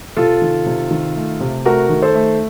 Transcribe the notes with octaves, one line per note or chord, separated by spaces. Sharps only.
C3 F4 A4
D#3
C3
D#3
A3
C3
A3 F#4 A#4
D#3
A4 C5
A3